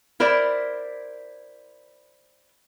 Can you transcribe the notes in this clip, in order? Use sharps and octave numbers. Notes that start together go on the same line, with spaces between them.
E4 A#4 C5 D5